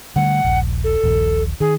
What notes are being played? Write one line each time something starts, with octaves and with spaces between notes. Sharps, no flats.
D3 G3 A3 F#5
D#1 A#1
A4
D#1 A#1
D#3 G#4